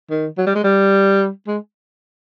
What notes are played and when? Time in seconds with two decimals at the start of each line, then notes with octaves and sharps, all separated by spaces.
0.10 D#3
0.38 F#3
0.47 G3
0.55 G#3
0.64 G3
1.47 G#3